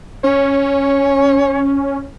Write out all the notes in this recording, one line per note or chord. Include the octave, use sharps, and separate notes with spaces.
C#4 C#5